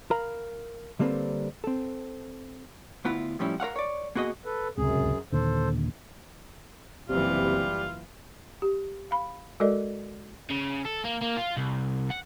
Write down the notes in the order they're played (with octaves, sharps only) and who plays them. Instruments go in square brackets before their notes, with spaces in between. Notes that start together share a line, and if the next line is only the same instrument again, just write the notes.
[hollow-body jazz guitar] A#4 F5 A#5 B5
D3 G3 A#3 C4 A4 B4
C4 A4
D2 B3 E4 F4
A2 F3 G3 C#4 E4
A#4 C#5 F5 F#5
C#5 D5
A#3 B3 F#4 G#4 D#5
[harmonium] A4 B4
[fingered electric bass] D1 C#2 C3 [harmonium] F#2 G#4
[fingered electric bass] D#2 A#2 D3 [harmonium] A4 C5
[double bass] F#1 E3 [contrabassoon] C3 [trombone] G3 [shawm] F4
[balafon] G4
F5 B5
G#3 F#4 A4 A#4 D5 D#5
[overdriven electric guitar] C#3
A4
A#3
A#3
F4
C2
F#5